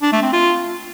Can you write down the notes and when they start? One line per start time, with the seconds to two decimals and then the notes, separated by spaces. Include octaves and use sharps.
0.02 D4
0.12 A3
0.22 C4
0.33 F4